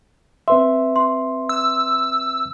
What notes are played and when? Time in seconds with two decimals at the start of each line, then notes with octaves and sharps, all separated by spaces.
0.48 C4 B4 E5 C6
0.96 C6
1.49 E6